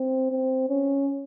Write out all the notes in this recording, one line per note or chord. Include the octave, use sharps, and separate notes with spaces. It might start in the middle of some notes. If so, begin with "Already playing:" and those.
Already playing: C4
C4
C#4